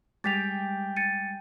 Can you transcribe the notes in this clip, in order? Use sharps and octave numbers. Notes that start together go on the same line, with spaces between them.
G3 G#3 G5 G#5 D6 A6 B6 F7
A6 C#7 D#7